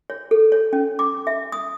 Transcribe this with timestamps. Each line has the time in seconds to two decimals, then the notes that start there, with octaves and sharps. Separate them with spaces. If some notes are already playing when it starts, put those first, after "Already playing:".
0.10 C#5
0.31 A4
0.52 C#5
0.73 C#4
0.99 D6
1.27 E5
1.52 D#6